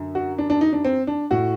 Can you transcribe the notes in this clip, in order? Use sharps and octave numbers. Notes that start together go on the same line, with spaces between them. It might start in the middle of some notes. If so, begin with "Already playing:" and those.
Already playing: F#2 D3
F#4
D4
D4
D#4
D4
C4
D4
A2 F#4